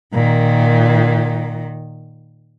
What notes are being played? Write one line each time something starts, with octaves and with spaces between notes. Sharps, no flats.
A#2 D#3